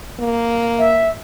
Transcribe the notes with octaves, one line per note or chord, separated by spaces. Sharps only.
A#3
E5